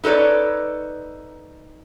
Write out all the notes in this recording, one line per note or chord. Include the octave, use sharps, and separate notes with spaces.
D#4 A4 B4 C#5 D5